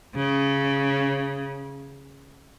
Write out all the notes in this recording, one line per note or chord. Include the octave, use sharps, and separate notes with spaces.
C#3